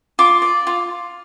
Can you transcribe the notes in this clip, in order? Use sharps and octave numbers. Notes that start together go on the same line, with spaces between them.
F4 D6
D5
F4